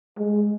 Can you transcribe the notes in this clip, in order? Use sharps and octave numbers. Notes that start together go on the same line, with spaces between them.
G#3